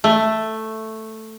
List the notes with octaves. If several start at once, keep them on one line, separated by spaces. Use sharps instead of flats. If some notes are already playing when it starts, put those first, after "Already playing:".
A3